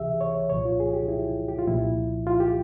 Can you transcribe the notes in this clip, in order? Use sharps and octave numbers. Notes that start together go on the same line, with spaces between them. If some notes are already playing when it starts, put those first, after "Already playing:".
Already playing: C#2 C3 E3 G4 G#4 E5
C#5
C2 A#2 F3 C#5
F4
G#4
G4
E4
G4
F4
C2 A#2 F3 E4
F4
G4